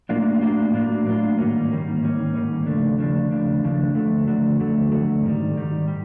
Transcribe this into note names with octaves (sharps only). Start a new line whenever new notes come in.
A2 F#3 A#3 D4 F4
A2 F#3 A#3 D4 F4
A2 F#3 A#3 D4 F4
A2 F#3 A#3 D4 F4
G#2 D#3 G3 A#3 C#4
G#2 D#3 G3 A#3 C#4
G#2 D#3 G3 A#3 C#4
G#2 D#3 G3 A#3 C#4
D#2 C#3 F3 A3 D4
D#2 C#3 F3 A3 D4
D#2 C#3 F3 A3 D4
D#2 C#3 F3 A3 D4
F2 D3 F#3 A3
F2 D3 F#3 A3
F2 D3 F#3 A3
F2 D3 F#3 A3
G#2 D#3 G3
G#2 D#3 G3
G3